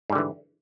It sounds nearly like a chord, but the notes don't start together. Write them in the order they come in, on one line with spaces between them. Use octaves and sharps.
G#2 G3 D3 E3